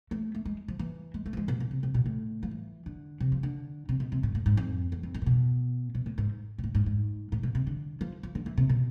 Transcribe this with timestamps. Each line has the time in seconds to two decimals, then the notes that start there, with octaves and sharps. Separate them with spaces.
0.11 A3
0.35 A3
0.46 G#3
0.68 F3
0.79 E3
1.14 G#3
1.26 A3
1.33 F3
1.37 G#3
1.48 B2
1.60 B2
1.71 C3
1.83 C3
1.94 B2
2.06 A2
2.43 F3
2.51 E3
2.86 D3
3.20 C3
3.32 F3
3.43 D3
3.89 C3
4.00 B2
4.12 C3
4.23 A2
4.35 A2
4.46 G#2
4.57 F2
4.92 E2
5.03 F2
5.15 G#2
5.22 A2
5.26 B2
5.95 B2
6.06 A2
6.18 G#2
6.58 B2
6.64 A2
6.75 G#2
6.86 G#2
7.32 A2
7.43 B2
7.55 C3
7.67 D3
8.01 F3
8.23 F3
8.35 D3
8.46 E3
8.58 C3
8.70 B2